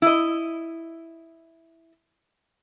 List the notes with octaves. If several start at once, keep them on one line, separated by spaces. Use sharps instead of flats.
E4 D#5